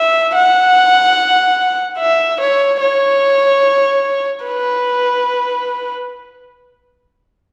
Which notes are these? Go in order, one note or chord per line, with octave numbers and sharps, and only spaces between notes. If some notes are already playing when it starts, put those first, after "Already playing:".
Already playing: E5
F#5
E5
C#5
C#5
B4